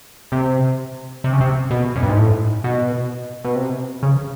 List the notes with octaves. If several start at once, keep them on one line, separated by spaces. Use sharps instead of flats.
C3
C3
C#3
C3
B2
F#2
G2
G#2
A2
B2
B2
C3
C#3